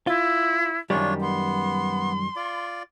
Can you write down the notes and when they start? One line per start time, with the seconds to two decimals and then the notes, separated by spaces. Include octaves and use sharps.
0.07 E4 F4
0.90 F#2 D#3 G3 D4 F4 C#5
1.21 B3 C6
2.36 F4 D5